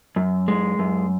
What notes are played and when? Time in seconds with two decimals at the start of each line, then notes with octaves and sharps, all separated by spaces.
0.16 F#2
0.48 G#3
0.79 F#2